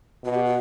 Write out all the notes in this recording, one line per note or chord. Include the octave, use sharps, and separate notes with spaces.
B2 F#4
G4
F#4